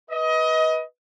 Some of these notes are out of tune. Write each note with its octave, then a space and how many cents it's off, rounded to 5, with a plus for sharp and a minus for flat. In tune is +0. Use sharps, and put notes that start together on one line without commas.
B4 -10 D#5 +25